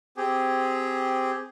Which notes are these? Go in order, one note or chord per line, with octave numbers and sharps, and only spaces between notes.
C4 G4 G#4